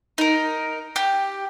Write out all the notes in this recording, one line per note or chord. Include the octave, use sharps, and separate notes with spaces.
D#4 A#4
G4